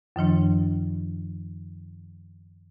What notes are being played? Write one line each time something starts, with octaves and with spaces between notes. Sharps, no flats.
F#2 D#3 F3 D4